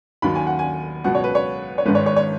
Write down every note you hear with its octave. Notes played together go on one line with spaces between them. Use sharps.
D#2 D#3 F#3 B5
G#5
F#5
G#5
C#2 B2 F#3 F#5
C#5
B4
C#5
C#5
G#1 G#2 D#3 B4
C#5
C#5
C#5